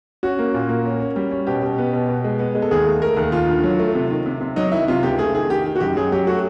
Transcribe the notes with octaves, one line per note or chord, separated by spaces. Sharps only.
C#4 F#4
A#3
A#2
A#3
C#4
C#4
G3
C#4
B2 G4
B2
B3
B2
B2
G#3
B3
G#3
A4
D#2 G#4
A3
A3 A#4
D#2
D#2 F4
D3
F#3
A3
C3
D#3
C3
C3
F#3 D#4
D#3 E4
C3 F4
C#2 G4
A3 G#4
D#3 G#4
D#3 G4
D#3
F#4
F#2 G4
F#3 G#4
F#3 G4
A3 F#4